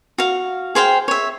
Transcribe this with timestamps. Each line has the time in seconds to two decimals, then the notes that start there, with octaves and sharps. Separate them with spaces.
0.18 F#4 F5
0.75 G#4 C5 F5 G5
1.08 C#5 E5